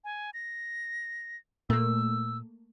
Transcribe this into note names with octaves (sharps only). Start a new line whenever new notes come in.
G#5
A#6
A#2 A3 A#3 E6